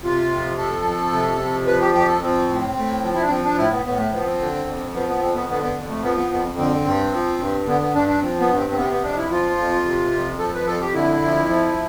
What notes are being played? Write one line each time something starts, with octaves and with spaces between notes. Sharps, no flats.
C3 F4
F2
F3 A4
F2
C3
F2
F3 B4
G4
F2 G4
A4
F3 C4
A2
A2
F3
E4
D4
F3 C4
D4
A2 E4
B3
A2 B3
A3
F3 B3
C4
D3
F2
F3 B3
B3
F2 C4
B3
D3 B3
B3
F2
A3
F3 B3
B3
F2 B3
D3 C4
G2
F3
G2
D3 B3
B3
G2 D4
D4
F3 C4
B3
G2
C4
C4
C3 B3
C4
B3
F2 D4
E4
F3 F4
F2
C3
F2
F3 A4
B4
F2 A4
G4
D3 E4
F2
F3